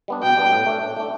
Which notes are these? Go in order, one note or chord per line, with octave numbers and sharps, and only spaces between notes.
G3 B3 D4
B2 G5
G3 B3 D4
A2
A3 D4
A2
A3 D4